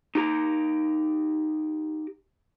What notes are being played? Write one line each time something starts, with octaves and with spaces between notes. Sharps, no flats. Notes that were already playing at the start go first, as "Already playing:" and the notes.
D#4 G4 A#5